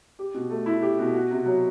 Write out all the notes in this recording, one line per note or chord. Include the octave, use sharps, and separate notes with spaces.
G4
B2
A3
E4
G4
B2
F#4
C3
F#3